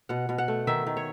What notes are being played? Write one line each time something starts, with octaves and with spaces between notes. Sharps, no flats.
B2 F#5
B2
F#5
A3
D#3 E5
D#3
C#5